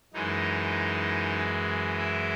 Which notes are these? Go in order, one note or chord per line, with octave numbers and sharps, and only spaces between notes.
F#2 E3 G#3 D#4
E4